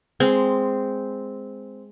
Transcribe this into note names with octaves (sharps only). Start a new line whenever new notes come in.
G#3 C4